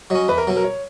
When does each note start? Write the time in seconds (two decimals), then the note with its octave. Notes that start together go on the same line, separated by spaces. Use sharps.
0.10 F#3 C#4 D#5
0.28 E2 B4
0.38 A#4
0.47 B2 F#3
0.56 A#4
0.64 C#5